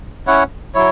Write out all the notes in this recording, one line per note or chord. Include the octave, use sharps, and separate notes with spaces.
C#4 E4 C#5 F#5
F#3 E4 C#5